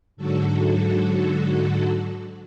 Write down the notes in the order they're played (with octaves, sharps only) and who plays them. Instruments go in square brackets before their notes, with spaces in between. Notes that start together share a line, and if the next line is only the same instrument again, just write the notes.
[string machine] G#2 D3 F#3 F#4 A4